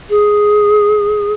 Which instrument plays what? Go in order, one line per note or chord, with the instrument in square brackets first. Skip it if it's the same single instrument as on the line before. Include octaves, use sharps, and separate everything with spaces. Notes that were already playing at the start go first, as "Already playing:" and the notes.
[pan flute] G#4